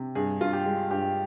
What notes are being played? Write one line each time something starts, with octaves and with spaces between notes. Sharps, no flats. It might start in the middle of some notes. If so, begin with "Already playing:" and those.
Already playing: C3
G2 G#4
G2 F4
G4
G#3
G2 G4